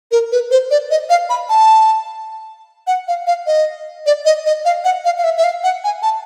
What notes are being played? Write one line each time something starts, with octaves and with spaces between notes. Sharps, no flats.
A#4
B4
C5
D5
D#5
F5
B5
A5
F#5
F5
F5
D#5
D5
D#5
D#5
F5
F#5
F5
F5
E5
E5
F5
F#5
G#5
A5